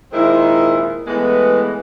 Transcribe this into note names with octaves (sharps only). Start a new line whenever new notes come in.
A#2 D#3 G#3 C4 E4
A2 E3 G#3 B3